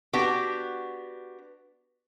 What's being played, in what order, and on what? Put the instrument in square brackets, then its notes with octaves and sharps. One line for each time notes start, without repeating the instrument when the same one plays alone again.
[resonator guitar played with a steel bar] B3 D4 F#4 G4